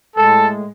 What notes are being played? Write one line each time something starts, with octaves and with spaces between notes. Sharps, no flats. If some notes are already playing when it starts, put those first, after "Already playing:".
A2 G#3 A4